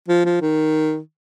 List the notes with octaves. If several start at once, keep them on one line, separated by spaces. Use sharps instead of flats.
F3
F3
D#3